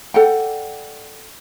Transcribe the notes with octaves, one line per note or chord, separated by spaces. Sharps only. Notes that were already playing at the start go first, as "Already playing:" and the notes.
A4 D5 F#5 G5